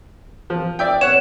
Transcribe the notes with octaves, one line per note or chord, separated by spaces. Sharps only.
F3
D5 E5 G5
C#5 F#5 E7